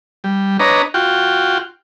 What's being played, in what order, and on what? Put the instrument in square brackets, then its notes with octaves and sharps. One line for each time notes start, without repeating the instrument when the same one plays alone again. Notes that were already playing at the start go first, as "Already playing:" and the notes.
[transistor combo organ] G3
D4 B4 C#5 D#5 A#5
F4 F#4 G5